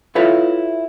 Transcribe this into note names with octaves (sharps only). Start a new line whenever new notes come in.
E4 F4 A4 B4 C#5